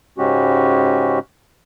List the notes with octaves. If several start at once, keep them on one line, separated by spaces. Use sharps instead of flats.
G#2 C#3 G#3 C#4 F#4 G4